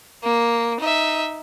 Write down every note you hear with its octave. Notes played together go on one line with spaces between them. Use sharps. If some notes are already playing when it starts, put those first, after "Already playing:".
A#3
D#4 E5